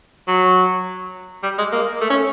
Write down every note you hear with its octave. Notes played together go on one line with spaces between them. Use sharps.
F#3
G3
G#3
A#3
A3
C#4